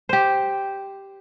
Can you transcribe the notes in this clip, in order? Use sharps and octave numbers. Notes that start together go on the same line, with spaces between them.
G4 C5